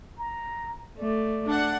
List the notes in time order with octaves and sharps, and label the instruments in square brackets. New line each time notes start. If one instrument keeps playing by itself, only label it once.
[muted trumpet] A#5
[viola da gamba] A3 [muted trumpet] D5
[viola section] D4 F#5